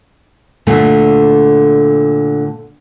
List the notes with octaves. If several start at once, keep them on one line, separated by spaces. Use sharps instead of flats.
A#2 D3 A3